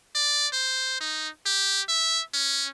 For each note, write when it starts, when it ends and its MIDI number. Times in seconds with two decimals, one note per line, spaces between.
0.15 0.47 74
0.53 0.98 72
1.01 1.28 63
1.46 1.81 67
1.88 2.22 76
2.34 2.69 61